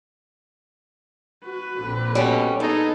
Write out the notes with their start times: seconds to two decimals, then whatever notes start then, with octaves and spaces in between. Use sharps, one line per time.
1.44 F#4 B4
1.78 A#1 D3 C4
2.15 B2 G3 C#4
2.60 B3 D#4 G#4 A4